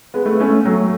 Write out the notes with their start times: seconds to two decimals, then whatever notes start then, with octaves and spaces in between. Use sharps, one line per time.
0.14 G#3 B3
0.26 A3
0.32 B3
0.40 A3 C#4
0.65 F#3 A3